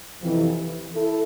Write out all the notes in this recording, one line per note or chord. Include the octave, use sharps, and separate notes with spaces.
F2 C3 E3
E4 A4